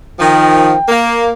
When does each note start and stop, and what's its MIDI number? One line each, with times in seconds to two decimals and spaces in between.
0.20 0.73 51
0.20 0.73 53
0.20 0.89 79
0.89 1.33 58